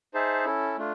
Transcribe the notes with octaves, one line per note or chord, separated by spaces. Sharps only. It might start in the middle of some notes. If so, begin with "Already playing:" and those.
D#4 G#4 C5 E5 A5
C#4 E4 A4
A3 D4 F4